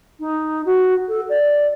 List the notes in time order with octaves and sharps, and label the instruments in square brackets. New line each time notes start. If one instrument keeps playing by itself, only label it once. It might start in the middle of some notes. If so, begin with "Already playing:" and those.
[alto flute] D#4
F#4
A4
D5